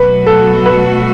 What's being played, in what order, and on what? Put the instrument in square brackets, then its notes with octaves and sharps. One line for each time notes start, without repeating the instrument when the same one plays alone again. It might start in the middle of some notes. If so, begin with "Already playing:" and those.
Already playing: [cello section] B2 F#3 A3 F#4 [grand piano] B4
[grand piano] A4
B4